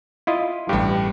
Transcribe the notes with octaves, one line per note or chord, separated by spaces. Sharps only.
E4 F4 D#5
A1 G2 G3 G4